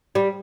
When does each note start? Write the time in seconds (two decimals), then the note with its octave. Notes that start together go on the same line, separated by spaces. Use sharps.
0.15 G3